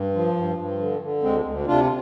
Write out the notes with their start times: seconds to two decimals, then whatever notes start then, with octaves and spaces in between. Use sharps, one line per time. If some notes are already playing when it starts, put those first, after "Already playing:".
Already playing: G2
0.14 F3
0.36 G2
0.58 G2
0.79 D3
1.01 D3
1.23 D2 G#3 C4
1.45 D2
1.67 C3 D4 F4